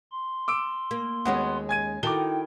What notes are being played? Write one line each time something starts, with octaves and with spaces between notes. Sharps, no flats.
C6
D6 E6 D7
A#3
D#2 G#3 B3 C#4 F#4
G#5 G#6 D#7
D#3 E4 F#4 A4 G5 D6 G7